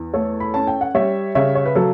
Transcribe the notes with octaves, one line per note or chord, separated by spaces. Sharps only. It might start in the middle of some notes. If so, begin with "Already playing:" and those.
Already playing: E2
A3 A4 C#5
B5
C#4 A5
G5
F#5
G3 C#5 E5
C#3 C#5 E5
C#5
B4
F#3 A4